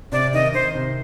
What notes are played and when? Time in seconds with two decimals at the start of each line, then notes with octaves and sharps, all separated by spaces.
0.12 C3 D5
0.34 D#3 D#5
0.54 D#3 C5
0.74 C3